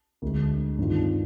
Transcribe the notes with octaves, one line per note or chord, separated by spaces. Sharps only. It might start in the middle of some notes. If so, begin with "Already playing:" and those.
D2 D3 G#3
G2 D#3 G#3 C4 F4